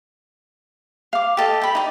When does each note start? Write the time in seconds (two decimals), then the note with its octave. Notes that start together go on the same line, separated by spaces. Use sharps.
1.13 F5 D6
1.37 G4 A4 D#5
1.62 G5 B5
1.75 D#4 D5